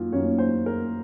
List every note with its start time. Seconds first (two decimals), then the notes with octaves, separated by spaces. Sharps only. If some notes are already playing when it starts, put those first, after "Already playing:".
Already playing: F#2 D#3 A#3 F4
0.12 F#2 D#3 A#3 C#4 C#5
0.38 C5
0.66 A#4